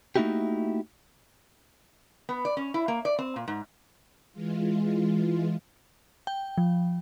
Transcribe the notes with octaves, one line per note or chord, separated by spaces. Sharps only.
A3 A#3 D#4 E4 F#4 G4
B3
D5
C#4
E4
A#3
D5
C4
A#2
G#2
E3 G#3 F4
G5
F3